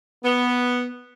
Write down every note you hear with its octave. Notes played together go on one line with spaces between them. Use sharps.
B3